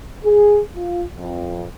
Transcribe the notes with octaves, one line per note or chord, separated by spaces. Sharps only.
G#4
F4
F2